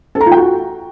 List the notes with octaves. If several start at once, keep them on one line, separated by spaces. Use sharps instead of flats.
A4
A#5
F4
G5
F#4